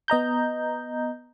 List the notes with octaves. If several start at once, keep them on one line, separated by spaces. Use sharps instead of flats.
B3 D#5 A#5 G6